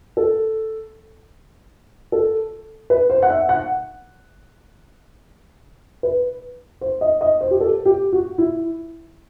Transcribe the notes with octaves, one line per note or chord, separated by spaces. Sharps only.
A4
A4
B4
C5
F#5
E5
F#5
B4
C5
D#5
D#5
C5
G4
A4
G4
F#4
E4